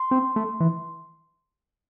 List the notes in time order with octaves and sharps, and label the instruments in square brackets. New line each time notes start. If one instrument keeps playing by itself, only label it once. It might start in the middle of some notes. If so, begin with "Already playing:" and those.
Already playing: [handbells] C6
[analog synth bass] C4
A3
E3